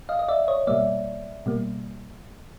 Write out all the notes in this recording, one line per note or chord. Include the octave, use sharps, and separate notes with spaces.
D#5 F5
D#5
D5 E5
C#5 D#5
B2 G3 A#3 D5 E5
B2 G3 A#3